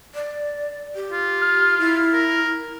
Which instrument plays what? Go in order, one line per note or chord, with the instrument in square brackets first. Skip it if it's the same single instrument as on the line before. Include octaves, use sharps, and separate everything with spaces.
[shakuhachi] D5
G4
[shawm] F4
[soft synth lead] F6
[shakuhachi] E4
[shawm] A#4